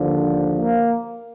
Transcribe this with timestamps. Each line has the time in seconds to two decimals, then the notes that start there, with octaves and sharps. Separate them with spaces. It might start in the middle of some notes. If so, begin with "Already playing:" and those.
Already playing: D#2 D3 F3
0.59 A#3